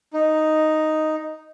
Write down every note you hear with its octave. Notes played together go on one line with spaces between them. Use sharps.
D#4